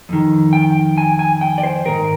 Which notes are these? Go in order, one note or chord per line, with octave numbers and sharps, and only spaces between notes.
F2 D#3
G5
G#5
G#5
G5
D5
C5
G#2 D#3 A#4